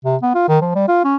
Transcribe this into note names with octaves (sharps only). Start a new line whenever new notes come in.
C3
B3
F4
D#3
F3
G3
F4
C#4